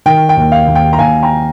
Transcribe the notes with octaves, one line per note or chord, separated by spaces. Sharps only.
D#3 G5
G5
D#2
F5
D#2
G5
A#5
D#2 F5 G#5
G5 A#5